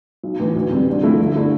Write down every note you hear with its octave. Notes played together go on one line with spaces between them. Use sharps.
B1
A2 E3
D2
C3 G3 C4
D3
F3 A3 E4
G1
D3 A3 E4